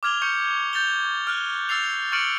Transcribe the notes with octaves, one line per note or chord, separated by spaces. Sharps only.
D6 F6 G#6 F7 G7
C#6 G6 C#7
G6 A6 F7 G7
F6 F#6
E6 A6 C7 F7
C#6 F6 A6 C#7 D7 F#7